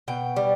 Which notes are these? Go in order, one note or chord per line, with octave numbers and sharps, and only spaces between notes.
B2 G5
G3